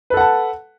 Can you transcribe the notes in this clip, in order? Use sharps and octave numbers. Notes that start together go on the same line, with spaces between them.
A4 B4 F#5 A5